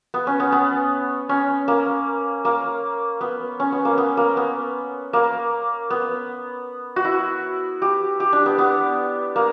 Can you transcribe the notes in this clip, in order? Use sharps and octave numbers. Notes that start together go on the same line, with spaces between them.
B3
C#4
B3
B3
C#4
A#3
A#3
B3
C#4
B3
A#3
B3
A#3
B3
A#3
B3
F#4
E4
G4
G4
D4
B3
B3
A#3